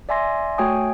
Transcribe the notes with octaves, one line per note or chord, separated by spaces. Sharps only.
D5 E5 G#5 C6 A#6
A3 F#4 C#5 G5 G#5 D#6